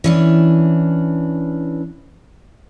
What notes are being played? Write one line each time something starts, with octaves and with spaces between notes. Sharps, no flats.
E3 C#4 D4